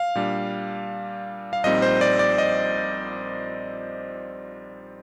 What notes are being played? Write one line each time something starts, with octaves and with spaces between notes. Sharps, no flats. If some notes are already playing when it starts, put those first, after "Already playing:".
Already playing: F5
A#2 G3 D4
F5
A#1 A#2 G3 C4 D#4 D#5
C5
D5
D5
D#5